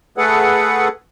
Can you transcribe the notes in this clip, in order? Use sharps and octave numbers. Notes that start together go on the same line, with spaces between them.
A3 G#4 A4 B4 F#5